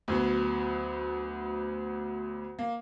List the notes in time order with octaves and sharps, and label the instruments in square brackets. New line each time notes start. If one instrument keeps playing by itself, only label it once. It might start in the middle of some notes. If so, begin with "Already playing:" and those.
[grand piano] D2 F#3 B3
A#3